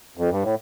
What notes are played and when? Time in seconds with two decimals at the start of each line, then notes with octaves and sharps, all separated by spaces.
0.17 F2
0.31 G2
0.42 A2